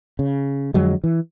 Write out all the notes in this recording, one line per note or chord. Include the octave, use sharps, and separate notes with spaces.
C#3
F2 D3 F#3 G#3
E3